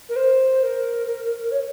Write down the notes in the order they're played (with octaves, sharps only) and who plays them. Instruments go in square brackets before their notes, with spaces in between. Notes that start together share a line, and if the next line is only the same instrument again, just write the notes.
[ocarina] A#4
C5
A#4
C#5